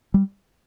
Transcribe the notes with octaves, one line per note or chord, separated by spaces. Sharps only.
G3